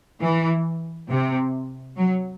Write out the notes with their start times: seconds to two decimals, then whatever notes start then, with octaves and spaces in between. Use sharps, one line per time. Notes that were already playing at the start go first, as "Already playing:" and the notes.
0.20 E3
1.09 C3
1.96 F#3